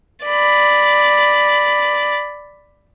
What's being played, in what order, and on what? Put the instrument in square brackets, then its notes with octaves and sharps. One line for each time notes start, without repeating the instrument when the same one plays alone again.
[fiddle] D5 B5